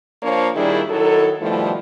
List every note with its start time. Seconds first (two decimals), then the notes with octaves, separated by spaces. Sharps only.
0.23 F3 A#3 D4 C5 C#5
0.56 A#2 D#3 G3 D4 E4 G#4
0.90 D#3 F#3 E4 A4
1.41 B2 D#3 F3 G3 A3 E4